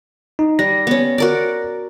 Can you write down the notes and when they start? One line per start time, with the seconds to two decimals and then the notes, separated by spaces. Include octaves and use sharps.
0.39 D#4
0.59 G3 A#6
0.87 B3 C#4
1.18 F#4 A#4 D5